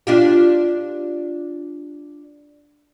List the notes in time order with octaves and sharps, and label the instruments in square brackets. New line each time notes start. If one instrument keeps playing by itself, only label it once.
[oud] D4 F4 G4